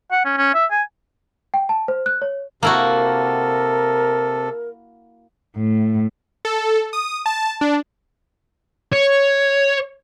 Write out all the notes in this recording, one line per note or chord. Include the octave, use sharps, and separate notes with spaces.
F#5
C#4
C#4
E5
G#5
G5
A5
C5
F#6
C#5
C3 A#3 E4 F#4 A4 A#4
A2
A4
D#6
A5
D4
C#5